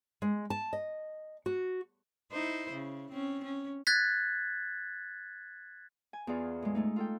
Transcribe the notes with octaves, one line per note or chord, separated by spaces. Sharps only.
G#3
A5
D#5
F#4
D#4 E4 C5
C#3
C4 C#4
C#4
F#6 G#6 A6 B6
G#5
E2 B3 F4 G#4 D5
A2 G#3
G#3 A3 D#4
F4 A4 G5